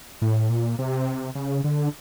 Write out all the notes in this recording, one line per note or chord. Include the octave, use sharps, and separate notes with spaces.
A2
A#2
C3
C#3
D3